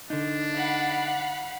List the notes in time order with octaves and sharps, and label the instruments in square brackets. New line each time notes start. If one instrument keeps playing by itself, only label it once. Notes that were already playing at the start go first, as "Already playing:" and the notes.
[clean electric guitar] D3 D#4 [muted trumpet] D4
[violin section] F5 F#5 B5